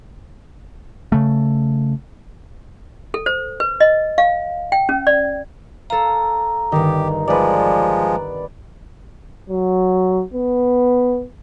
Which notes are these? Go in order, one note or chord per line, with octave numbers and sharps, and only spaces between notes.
C#3 A3
A4
C5
B4
D#5
F5
G5
C#4
D5
A4 F5 A#5
G1 D#3 D#4 G4
F3 G#3 B4 D5
F#3
B3